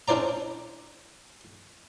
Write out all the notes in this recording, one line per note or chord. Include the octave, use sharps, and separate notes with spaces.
C#4 D4 E4 C5 D5 A#5